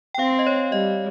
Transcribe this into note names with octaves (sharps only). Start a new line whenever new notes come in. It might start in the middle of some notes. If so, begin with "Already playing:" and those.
G5
C4 F5
D#5
C#5
G3 D#5